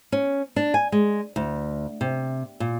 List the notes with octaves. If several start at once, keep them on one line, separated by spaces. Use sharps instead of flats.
C#4
D4
G#5
G#3
D2
C3
A#2